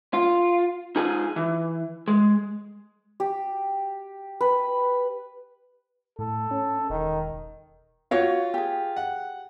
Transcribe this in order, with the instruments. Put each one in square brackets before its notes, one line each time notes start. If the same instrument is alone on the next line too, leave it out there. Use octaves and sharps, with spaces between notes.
[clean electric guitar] F4
D#4 F4 G#4 G#5
E3
G#3
[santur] G4
B4
[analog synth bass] A2 [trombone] A4
[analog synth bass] C#4
[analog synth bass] E1 [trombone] D#3
[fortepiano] F4 [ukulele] F#4 C#5 F5
[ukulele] G4 G#4
[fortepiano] F#5